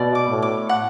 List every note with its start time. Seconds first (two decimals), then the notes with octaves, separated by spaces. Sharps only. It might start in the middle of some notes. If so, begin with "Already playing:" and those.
Already playing: B2 D5
0.15 D6
0.28 A2
0.42 D6
0.69 F#5